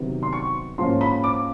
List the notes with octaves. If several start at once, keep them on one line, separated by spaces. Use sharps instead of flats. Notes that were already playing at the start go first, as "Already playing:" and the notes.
Already playing: C3 D#3 F#3 B3
C6
C#6
G#2 F3 A#3 C#4 C6
B5
D6